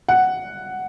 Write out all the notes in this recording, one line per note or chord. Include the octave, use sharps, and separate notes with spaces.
F#5